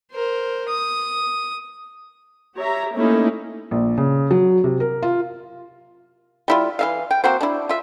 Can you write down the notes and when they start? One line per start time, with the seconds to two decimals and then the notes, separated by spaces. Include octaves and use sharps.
0.12 A#4 C5
0.69 D#6
2.57 G4 C#5 E5 A#5
2.95 A3 A#3 C#4 D#4 E4
3.71 A#1
3.98 C#3
4.31 F#3
4.64 C3
4.80 A#4
5.02 F4
6.48 G3 E4 F4
6.79 E3 E5 F5
7.11 G5
7.24 A#3 C4 F#4 C5
7.41 D4 E4
7.69 F4 E5